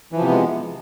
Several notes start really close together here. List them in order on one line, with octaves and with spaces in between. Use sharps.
E3 F3 C3 B3 G#3